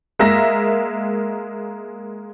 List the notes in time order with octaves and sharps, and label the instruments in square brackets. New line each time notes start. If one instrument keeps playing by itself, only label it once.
[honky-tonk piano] G#3 A#3 A#4 E5 A#5 A#6